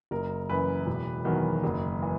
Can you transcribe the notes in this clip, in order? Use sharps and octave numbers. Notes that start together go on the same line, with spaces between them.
F#1 A#4
F#2 E3 B4
E1
E2 D#3 F#3
F#1
E3